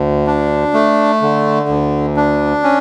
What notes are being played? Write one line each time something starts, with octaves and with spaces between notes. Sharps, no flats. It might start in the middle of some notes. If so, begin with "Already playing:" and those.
Already playing: D2
D4
A3
D3
D2
D4
C#4